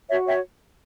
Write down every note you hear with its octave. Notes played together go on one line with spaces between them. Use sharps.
F#4 C#5 E5
C#5 E5 G5